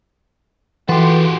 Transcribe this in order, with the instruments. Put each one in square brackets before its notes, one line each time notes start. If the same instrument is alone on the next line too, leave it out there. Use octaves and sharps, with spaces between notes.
[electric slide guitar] E3 A4 B4 [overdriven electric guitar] F#4 G4 [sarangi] C6